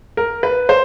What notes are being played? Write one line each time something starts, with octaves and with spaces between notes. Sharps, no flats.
A#4
B4
C5